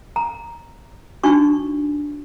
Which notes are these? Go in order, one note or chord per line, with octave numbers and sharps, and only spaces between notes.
A#5
D4 D#4 F#4 C#6